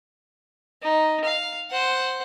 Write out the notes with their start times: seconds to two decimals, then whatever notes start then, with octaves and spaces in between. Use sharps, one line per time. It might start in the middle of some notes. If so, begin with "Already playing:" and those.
0.82 D#4
1.24 F5
1.71 C5 F#5